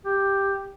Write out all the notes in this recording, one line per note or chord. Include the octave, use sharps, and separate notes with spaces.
G4